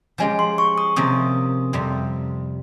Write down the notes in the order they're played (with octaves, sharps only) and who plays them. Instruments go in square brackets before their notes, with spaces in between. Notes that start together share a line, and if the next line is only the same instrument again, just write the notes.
[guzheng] F3 G#3 C#4 G4 [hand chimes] G#5
[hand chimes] C6
C#6
D#6
[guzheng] C3 F3 A#3 C#4 [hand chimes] D#6
[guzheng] F2 C3 G3